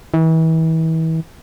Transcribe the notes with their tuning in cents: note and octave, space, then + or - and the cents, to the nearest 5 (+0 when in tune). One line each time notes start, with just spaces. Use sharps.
E3 -35